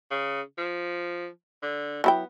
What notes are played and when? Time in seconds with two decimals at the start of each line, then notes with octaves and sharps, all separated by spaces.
0.11 C#3
0.58 F3
1.63 D3
2.04 F#3 B3 E4 G5